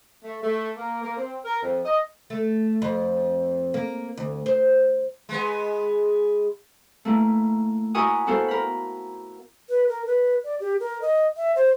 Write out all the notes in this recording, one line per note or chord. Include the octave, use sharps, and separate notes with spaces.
A3
A3
A#3
A#3
C4
A#4
F2
D#5
A3
F2
A#3
D2
C5
G#3 B3
A3 A#3 E4
E4 F#4 A#4 G#5 C#6 D#6
B3 E4 F#4 A4 C5 F5
A#4 B5
B4
A#4
B4
D5
G4
A#4
D#5
E5
C5